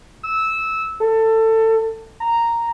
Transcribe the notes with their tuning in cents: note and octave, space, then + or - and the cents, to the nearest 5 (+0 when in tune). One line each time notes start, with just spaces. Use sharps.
E6 -15
A4 +20
A#5 -5